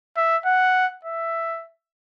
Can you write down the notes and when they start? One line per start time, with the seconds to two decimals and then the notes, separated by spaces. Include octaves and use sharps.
0.17 E5
0.46 F#5
1.04 E5